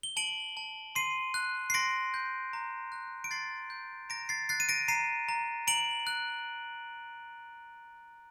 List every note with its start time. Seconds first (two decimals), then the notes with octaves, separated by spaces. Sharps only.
0.03 G7
0.17 A5 D7 F#7
0.57 A5
0.95 C6 C7 D#7
1.34 F#6
1.70 C7
1.74 C6 A#6 D7
2.14 G6
2.53 A#5
2.92 F#6
3.24 D7
3.31 C6 A6 C7
3.70 G6
4.09 A#5 A#6 D7
4.29 A6 C7
4.49 F#6 A6 C7
4.60 D#7
4.69 A#6 D7
4.88 A#5 C7 D#7
5.29 A#5
5.67 A#5 D7 F#7
6.07 F#6